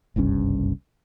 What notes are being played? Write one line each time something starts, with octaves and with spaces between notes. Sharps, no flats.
F#1 C2 G2 C#4